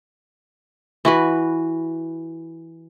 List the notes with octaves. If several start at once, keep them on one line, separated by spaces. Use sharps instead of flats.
E3 F#4 B4